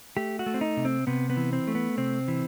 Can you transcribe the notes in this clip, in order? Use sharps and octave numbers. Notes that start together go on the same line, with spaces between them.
A3 G4
F#4
A3
C4
D#4
C3
C4
C3 B3
B3
E3
C4
A3
B3
C3 C4
E3